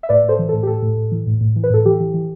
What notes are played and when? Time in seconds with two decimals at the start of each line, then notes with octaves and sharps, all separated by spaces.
0.03 E5
0.09 A2 B4 D5
0.24 A2 A4 C5
0.39 E3
0.49 A4
0.53 A2
0.63 G4
0.67 A2 A4
0.82 A2
0.97 A2
1.12 E3
1.27 A2
1.41 A2
1.56 E3
1.64 B4
1.70 A2 A4
1.85 E3 G4
2.00 E3
2.14 E3